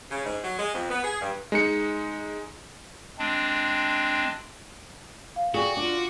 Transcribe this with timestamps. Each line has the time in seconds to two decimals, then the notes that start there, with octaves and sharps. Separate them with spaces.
0.11 C#3
0.25 G#2
0.44 F#3
0.59 G#3
0.74 F2
0.90 B3
1.04 G#4
1.21 G2
1.52 G#3 D#4 C#7
3.19 G#3 C4 D4
5.36 F5
5.54 F#4 G#4 D5 G5 C#6
5.77 D4 F4 D6